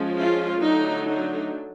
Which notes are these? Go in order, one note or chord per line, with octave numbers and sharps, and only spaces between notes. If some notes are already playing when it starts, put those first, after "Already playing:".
Already playing: F3 G#3 C#4
F4
D3 F#3 A3 D4 D#4
D#4